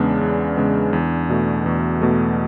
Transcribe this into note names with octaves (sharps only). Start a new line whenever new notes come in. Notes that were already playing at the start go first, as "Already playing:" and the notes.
Already playing: E2 C#3 G#3 B3 D4
E2
C#3 G#3 B3
E2
B2 A3
E2
B2 A3